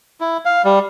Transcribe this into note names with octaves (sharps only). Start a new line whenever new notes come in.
E4
F5
G3